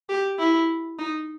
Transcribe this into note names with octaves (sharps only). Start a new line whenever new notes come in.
G4
E4
D#4